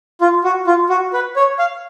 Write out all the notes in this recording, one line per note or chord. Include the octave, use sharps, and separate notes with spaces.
F4
F#4
F4
F#4
B4
C#5
F5